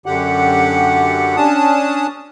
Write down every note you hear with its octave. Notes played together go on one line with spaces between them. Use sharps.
F#2 D3 G4 F#5
C#4 D4 A5 D#6